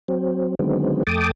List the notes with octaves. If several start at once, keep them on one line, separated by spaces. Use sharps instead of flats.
F#3 C4
D3 D#3 F#3 G#3 B3 C4
F2 A3 G5 A5 D6 D#6